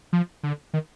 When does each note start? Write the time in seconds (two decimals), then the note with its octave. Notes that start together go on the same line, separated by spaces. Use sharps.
0.13 F3
0.43 D3
0.74 D#3